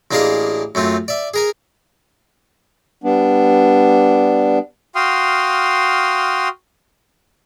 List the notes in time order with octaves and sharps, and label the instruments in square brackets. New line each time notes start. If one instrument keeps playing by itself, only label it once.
[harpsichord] A1 A#3 D4 G#4 D#5 F5
F#2 A3 C4 F4
D5 E5
G#4 A#4 G#5
[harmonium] G3 B3 D4
[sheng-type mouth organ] F#4 F5 G5 C6 D#6 F6